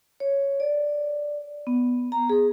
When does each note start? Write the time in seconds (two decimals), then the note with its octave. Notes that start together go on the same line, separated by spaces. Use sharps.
0.20 C#5
0.60 D5
1.67 B3
2.12 A#5
2.29 G#4